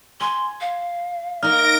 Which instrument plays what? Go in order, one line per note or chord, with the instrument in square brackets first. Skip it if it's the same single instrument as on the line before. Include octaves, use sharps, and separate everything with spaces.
[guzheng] G#5 [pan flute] C6
[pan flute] F5
[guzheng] A#3 D#4 [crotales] F6 [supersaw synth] A#6 D7